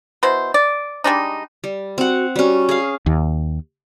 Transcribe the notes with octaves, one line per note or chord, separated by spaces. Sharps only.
B2 E4 C5
D5
G3 G#3 D4 D#4
G3
C4 F#4 F#5
G3 C#4 F#4
G#4 F5
D#2